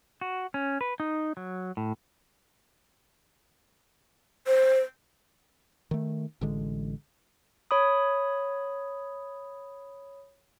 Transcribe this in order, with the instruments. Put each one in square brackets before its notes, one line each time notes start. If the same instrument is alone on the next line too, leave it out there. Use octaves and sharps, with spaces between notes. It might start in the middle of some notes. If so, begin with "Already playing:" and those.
[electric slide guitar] F#4
C#4
B4
D#4
F#3
A2
[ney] C5
[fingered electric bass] D#3 A3
A1 D3 G#3
[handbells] C#5 B5 D#6